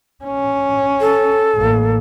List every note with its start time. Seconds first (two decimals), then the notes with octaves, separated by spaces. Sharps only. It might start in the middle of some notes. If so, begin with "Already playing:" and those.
0.25 C#4
1.01 A4
1.55 A1 A#3